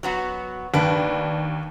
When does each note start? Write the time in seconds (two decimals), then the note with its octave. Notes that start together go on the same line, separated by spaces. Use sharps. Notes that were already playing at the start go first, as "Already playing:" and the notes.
0.03 F#3 B3 F#4
0.74 D#2 D4 B4